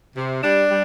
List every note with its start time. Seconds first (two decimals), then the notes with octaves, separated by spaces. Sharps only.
0.16 C3
0.43 G3 D4
0.69 G3